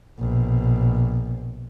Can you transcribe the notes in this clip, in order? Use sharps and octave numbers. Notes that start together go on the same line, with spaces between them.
A#1 B2